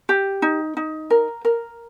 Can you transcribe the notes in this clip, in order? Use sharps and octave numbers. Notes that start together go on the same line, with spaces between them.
G4
D#4
D#4
A#4
A#4